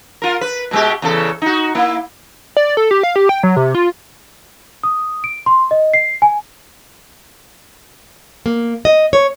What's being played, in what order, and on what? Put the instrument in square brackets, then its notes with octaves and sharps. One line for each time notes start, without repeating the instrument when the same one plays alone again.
[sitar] F4 A#4
B4
B2 G#3 G4
E2 C#3 A4
D#4 F#4
A#3 E4
[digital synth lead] D5
A4
G4
F5
G4
G5
F#3
C3
F4
[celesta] D#6
D7
C6
D#5
C7
G#5
[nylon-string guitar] A#3
D#5
C#5